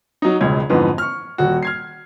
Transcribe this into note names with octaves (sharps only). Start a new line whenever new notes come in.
F#3 D#4
E1 C#2 G#3 G#6
F2 G#2 D3 E3 B3
C#6 F6
D#1 F#4
F6 G#6 C7